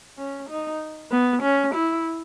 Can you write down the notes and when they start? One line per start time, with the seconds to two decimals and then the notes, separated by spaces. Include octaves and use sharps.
0.18 C#4
0.49 D#4
1.12 B3
1.42 C#4
1.74 E4